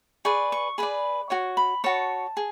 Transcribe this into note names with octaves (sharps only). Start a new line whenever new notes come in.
G#4 B4 D5 C#6
C#6
G#4 B4 D5 B5
F#4 C#5 C#6
B5
F#4 C#5 A5
G#4